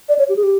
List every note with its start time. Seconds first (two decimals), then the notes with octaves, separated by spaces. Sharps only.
0.09 D5
0.19 C#5
0.29 G4
0.36 G#4
0.43 G4